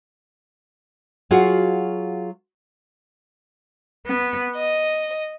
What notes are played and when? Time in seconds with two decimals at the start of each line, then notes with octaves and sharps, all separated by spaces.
1.31 F#3 F4 F#4 G#4 F5 F#5
4.07 B3
4.55 D#5